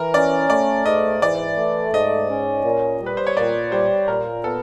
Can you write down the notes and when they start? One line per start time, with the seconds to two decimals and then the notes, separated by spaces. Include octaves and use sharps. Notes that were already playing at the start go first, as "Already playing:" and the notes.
Already playing: E3 A#4
0.14 C#4 D5
0.50 A3 D5
0.85 G#2 D#5
1.22 E3 D5
1.57 A3
1.93 G#2 D#5
2.30 C#4
2.64 A#2
3.01 G3
3.06 B4
3.17 C5
3.27 C#5
3.37 A#2 D5
3.72 G3 C5
4.08 A#2 A#4
4.44 B3 A4